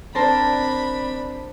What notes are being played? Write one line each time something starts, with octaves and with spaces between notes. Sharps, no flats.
C4 D4 A#4 C5 D5 A5 B5